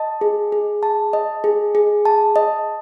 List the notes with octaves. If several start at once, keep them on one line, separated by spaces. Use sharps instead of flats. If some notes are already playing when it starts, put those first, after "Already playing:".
Already playing: D#5 A5
G#4
G#4
A5
D#5
G#4
G#4
A5
D#5